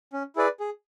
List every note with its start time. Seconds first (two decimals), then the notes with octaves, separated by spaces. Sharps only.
0.13 C#4
0.36 E4 G#4 B4 D5
0.60 G#4